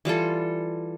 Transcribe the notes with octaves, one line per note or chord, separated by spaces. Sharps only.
E3 G3 F4 A4